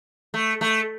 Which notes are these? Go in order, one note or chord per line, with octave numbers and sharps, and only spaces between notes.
A3
A3